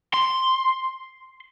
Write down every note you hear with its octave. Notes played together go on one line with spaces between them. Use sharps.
C6